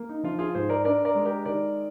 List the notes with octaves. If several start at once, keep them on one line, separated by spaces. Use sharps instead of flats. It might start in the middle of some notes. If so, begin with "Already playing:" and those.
Already playing: A#3
D#4
F3 F4
F4 G#4
G#2 G#4 C5
A#4 D5
D4 A#4 D5
A#4 D5
G#3
G4 A#4
D#3 A#4 D5